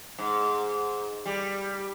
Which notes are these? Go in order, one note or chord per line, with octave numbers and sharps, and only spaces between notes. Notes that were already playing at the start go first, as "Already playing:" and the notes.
G#2
G3